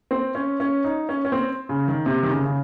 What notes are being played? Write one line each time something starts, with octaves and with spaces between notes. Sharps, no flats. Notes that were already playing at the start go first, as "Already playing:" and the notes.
C4
C#4
C#4
D#4
C#4
C#4
C4
C#3
D#3
C3
D#3
C#3
C#3